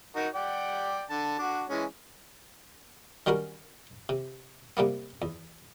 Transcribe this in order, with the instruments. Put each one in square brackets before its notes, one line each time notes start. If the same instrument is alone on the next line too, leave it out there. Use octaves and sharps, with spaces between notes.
[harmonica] D#4 F#4 A#4
D5 F#5 G5
D3 A5
D4 F#4
E3 G#3 C#4
[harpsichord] D#3 G3 C#4 F#4 A#4
C3
C3 G3 A#3 B3
E2